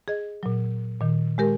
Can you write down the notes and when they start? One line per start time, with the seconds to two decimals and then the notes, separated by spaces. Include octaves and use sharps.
0.08 G#4 D#5
0.43 A#2 F#3
1.01 A#2 D#3
1.38 G#3 G4 A#4